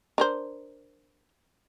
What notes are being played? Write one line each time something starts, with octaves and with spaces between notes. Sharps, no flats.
D4 A#4 C5